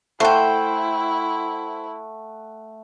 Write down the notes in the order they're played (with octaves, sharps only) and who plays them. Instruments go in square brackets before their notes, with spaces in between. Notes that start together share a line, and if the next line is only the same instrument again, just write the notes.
[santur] A3 F#5 [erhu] E4 [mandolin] C5 G5